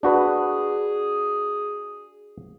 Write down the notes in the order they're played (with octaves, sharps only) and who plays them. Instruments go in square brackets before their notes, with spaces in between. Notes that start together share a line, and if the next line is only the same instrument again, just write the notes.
[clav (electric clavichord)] D4 F#4 B4 [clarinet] G#4